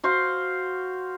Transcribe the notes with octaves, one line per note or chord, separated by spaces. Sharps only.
F#4 C5 F5